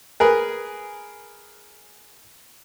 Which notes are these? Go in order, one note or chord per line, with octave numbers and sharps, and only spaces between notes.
G#4 A#4 B4